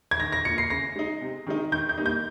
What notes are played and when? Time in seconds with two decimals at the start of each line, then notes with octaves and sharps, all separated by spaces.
0.11 G#6
0.20 D#3 A#6
0.32 A#6
0.45 A#3 F4 C#7
0.58 C7
0.70 C#3 A#6
0.96 G#3 D#4
1.21 C3
1.47 D#3 G#3 D#4
1.72 D#3 G6
1.89 G6
1.97 G3 A#3 D#4
2.06 G6